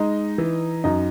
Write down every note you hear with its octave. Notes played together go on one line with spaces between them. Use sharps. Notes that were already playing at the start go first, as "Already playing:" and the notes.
Already playing: G#3 D#4
E3
F#2 D#4